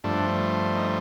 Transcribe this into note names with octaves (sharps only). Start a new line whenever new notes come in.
G2 F3 A3 D4
D#4